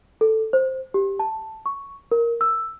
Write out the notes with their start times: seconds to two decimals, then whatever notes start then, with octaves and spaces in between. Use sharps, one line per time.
0.21 A4
0.53 C5
0.94 G4
1.19 A5
1.66 C#6
2.11 A#4
2.41 E6